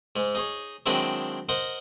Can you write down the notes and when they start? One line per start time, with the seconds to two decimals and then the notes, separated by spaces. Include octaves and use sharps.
0.16 G#2 G#3
0.35 D#4 G#4 C#5
0.86 D#3 F#3 G#3 C4 D4 E4
1.49 A#4 C5 D#5 F#5